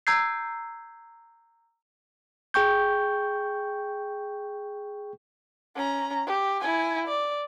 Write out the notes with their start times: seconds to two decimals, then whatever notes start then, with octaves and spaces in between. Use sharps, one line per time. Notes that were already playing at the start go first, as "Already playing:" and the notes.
0.07 A#5 E6 G6 G#6 C7
2.54 G#4 G5 C#6 G6
5.76 C#4 A#5
6.27 G4
6.61 E4 G#5
7.07 D5